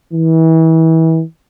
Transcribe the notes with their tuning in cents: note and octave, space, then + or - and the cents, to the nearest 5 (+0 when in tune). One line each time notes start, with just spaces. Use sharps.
E3 -30